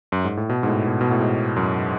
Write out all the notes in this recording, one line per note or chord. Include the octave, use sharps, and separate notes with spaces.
F#2
G#2
A2
B2
G#2
A2
B2
B2
A2
G#2
F#2